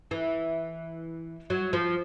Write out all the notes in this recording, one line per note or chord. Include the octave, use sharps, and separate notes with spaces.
E3
F#3
F3